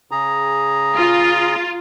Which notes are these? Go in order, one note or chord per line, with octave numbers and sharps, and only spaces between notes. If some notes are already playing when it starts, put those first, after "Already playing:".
C#3 G#4 A#5
F4